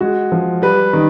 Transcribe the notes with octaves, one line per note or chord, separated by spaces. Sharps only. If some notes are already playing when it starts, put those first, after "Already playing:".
G#3 F#4
F3
G3 B4
D#3